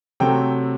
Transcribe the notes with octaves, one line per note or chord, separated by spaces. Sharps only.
C3 F#3 A3 C4 G5